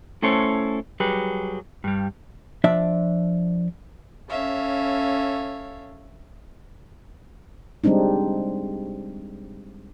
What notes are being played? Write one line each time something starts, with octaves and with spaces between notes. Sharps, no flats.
A3 C#4 E4 A4 C5 C#5
F#3 G3 G4 G#4 B4
G2 G3
F3 D4 D5 E5
C#4 A4 C#5 E5 F5
G3 G#3 C4 D4 D#4